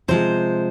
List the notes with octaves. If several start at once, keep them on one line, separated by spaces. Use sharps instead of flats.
C3 F3 G#3 C5